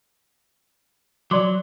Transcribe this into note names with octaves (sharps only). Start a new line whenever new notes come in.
F#3 D5 C6 D6